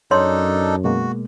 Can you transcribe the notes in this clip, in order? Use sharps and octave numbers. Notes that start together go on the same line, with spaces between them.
F#2 D4 D#4 A4 C#5 C6
B2 G#3 A#3 F#4